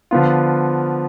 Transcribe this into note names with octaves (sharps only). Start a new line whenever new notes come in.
D3 F3 B3 F4